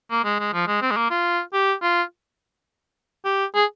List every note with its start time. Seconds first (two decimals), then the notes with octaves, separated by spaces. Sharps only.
0.11 A#3
0.25 G#3
0.39 G#3
0.53 F3
0.67 G#3
0.82 C4
0.91 G#3
0.97 A#3
1.10 F4
1.53 G4
1.82 F4
3.25 G4
3.55 G#4